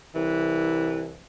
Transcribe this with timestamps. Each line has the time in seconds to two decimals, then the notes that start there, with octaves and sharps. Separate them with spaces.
0.15 C2 E3